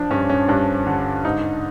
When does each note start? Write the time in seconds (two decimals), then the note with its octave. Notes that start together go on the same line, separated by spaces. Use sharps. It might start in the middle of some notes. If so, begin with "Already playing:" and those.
Already playing: F3 D4
0.11 G2 C#4
0.29 C#4
0.48 G2 D4
0.87 D3
1.25 G#2 D#4